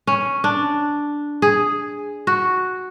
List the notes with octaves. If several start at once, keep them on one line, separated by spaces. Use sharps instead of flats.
C#4
D4
G#4
F#4